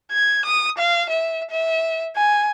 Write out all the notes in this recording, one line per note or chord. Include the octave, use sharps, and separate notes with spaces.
G#6
D#6
F5
E5
E5
G#5